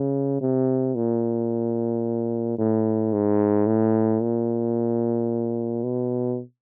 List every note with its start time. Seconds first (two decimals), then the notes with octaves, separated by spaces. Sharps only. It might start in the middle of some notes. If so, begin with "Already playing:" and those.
Already playing: C#3
0.41 C3
0.95 A#2
2.58 A2
3.13 G#2
3.66 A2
4.21 A#2
5.84 B2